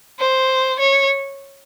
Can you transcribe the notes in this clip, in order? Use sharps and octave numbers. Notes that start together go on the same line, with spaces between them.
C5
C#5